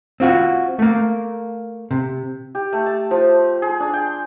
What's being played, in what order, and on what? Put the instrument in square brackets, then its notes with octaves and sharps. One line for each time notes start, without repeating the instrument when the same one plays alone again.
[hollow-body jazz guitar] C4 F4 F#4
A3 A#3
C3
[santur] G4
A3
A5
F3
G#4
D4
G5